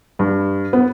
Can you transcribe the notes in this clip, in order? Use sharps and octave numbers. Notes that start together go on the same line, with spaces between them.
G2
B3